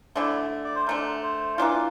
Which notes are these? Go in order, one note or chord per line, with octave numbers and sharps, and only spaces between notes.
D3 A3 D4 E4
D5
C5
D3 A3 D4 A#4
C5
E3 A#3 D4 F4